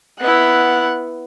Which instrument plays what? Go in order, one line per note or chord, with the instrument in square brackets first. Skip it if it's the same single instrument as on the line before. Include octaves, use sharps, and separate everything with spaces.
[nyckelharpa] B3 E4 [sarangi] F#5